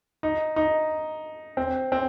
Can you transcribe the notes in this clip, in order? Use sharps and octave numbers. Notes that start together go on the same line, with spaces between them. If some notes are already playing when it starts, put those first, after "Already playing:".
D#4
D#4
C4
C4